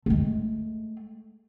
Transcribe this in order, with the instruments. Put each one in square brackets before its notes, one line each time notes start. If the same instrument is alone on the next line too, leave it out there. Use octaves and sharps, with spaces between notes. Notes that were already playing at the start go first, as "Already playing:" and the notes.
[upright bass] G#3 A3